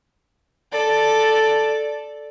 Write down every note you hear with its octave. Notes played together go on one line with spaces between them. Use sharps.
A4 D5